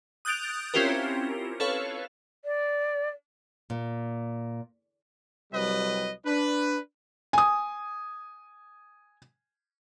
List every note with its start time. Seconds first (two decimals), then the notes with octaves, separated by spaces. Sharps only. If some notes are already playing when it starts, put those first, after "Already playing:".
0.25 D#6 F#6 G6 A6 D7 F7
0.74 C4 C#4 E4 F4 G4 A#4
1.60 A4 B4 C#5 F5
2.45 D5
3.70 A#2
5.52 C2 F#3 G3 B4 D#5
6.25 D4 B4
7.33 G#5 D#6